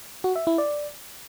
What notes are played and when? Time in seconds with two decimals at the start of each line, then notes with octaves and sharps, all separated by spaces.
0.24 F#4
0.36 E5
0.47 E4
0.58 D5